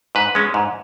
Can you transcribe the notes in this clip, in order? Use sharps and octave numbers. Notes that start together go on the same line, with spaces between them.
G#2 B4
G#3 C#4
G#2